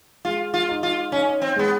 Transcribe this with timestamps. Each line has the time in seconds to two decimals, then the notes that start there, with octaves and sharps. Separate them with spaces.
0.25 G#3 F4
0.54 F4
0.69 D#4
0.83 F4
1.12 C#4 D#4
1.41 C4
1.56 G#3 B3